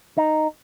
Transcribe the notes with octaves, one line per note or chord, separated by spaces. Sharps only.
D#4